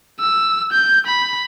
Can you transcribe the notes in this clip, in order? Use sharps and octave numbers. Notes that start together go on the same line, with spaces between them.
E6
G6
B5